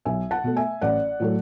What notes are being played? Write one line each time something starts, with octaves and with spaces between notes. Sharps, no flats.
B1 E5 G#5
F#5 A5
B2 A3
E5 G#5
A1 D5 F#5
A2 F#3 A3